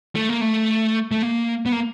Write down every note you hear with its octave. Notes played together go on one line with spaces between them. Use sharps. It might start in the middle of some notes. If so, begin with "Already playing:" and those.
A3
A#3
A3
A3
A#3
B3
A#3